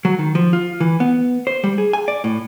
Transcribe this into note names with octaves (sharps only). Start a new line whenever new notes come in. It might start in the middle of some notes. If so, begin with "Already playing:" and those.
F#3
D#3
F3
F4
E3
B3
C5
G3
G#4
G#5
D5
A2